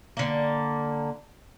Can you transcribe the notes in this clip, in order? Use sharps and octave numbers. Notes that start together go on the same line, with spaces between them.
D3 A#3